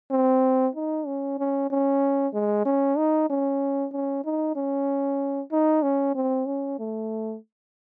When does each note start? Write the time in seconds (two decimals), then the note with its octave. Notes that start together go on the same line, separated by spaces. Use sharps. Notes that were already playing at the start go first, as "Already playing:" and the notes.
0.11 C4
0.76 D#4
1.06 C#4
1.39 C#4
1.71 C#4
2.33 G#3
2.66 C#4
2.97 D#4
3.30 C#4
3.92 C#4
4.25 D#4
4.56 C#4
5.52 D#4
5.83 C#4
6.15 C4
6.46 C#4
6.79 A3